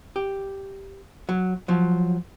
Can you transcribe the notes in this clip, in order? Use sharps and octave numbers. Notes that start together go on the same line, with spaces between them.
G4
F#3
F3 F#3